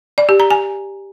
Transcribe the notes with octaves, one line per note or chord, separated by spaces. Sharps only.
D5
G4
A#5
G#5